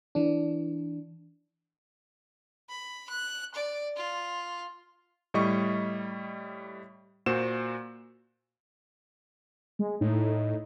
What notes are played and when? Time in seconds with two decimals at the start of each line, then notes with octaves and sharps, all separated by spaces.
0.15 E3 D4
2.69 B5
3.10 F#6
3.55 D5
3.96 F4
5.34 A2 G3 D#5 C#6
7.26 A#2 F#4 C5 E7
9.79 G#3
10.01 A2 D#4